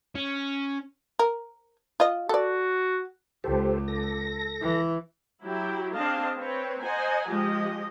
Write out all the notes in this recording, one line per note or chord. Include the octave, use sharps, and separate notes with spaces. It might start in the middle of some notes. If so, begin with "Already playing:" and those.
C#4
A#4
F4 D#5
F#4 A4 D5
C#2 G4 A4 C5
A4 A#6
E3
F#3 E4 G4
C4 D4 G#4 D#5 F5 A5
C4 B4 C#5
C5 D#5 F#5 G#5 A#5
F3 G#3 G4 D#5